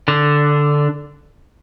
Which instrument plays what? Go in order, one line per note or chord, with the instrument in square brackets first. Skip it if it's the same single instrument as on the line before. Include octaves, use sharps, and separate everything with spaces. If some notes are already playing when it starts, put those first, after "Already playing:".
[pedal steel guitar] D3 D4